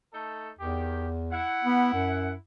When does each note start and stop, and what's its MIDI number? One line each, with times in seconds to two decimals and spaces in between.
0.12 0.48 57
0.12 0.48 63
0.12 0.48 69
0.59 1.43 40
0.59 1.07 51
0.59 1.07 67
1.32 2.33 64
1.32 2.33 78
1.64 1.92 59
1.94 2.35 42